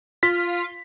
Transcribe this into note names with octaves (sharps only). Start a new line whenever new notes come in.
F4 B6